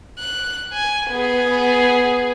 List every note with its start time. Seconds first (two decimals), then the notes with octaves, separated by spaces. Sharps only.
0.19 F#6
0.73 G#5
1.10 B3 G#4